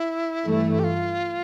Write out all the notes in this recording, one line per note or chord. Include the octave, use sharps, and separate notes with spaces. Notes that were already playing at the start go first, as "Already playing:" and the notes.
Already playing: E4
G2 E3 A3
G4
F4